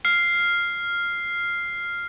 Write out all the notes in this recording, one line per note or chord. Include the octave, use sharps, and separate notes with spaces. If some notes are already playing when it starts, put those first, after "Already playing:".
F6 C7